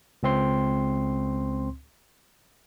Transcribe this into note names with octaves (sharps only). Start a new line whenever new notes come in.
C#2 C4 C6